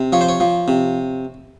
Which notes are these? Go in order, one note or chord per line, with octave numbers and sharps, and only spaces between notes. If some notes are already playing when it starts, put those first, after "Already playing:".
Already playing: C3
F3 C#5
C5
C#5
F3
C3